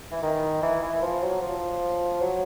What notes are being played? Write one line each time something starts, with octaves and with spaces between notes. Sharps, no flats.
E3
D#3
E3
E3
F3
F#3
F3
F#3